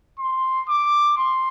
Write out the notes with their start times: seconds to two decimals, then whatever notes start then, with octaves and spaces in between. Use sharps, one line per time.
0.19 C6
0.69 D6
1.17 C6